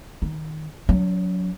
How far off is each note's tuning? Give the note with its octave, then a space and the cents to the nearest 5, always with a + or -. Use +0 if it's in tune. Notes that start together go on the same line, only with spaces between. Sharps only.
D#3 +0 D#4 +0
F#3 -15 C#4 +40